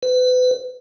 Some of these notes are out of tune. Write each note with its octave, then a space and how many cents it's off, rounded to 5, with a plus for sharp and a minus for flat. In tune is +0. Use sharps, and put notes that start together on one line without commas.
B4 +35